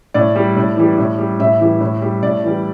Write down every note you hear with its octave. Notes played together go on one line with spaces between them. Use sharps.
A2 D5
G3
A2
E3 G3
A2
G3
A2 E5
E3 G3
A2
G3
A2 D5
E3 G3